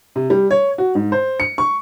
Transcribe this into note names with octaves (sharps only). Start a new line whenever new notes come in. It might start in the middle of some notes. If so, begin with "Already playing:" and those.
C3
G3
C#5
F#4
G#2
C5
C#7
C#6